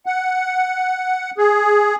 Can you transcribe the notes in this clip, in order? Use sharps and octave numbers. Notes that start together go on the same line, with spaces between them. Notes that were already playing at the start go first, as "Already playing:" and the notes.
F#5
G#4